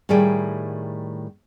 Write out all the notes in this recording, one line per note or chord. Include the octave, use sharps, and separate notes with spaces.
A2 D#3 G3 G#4 G5